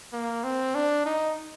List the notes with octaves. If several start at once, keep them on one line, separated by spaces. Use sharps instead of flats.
A#3
C4
D4
D#4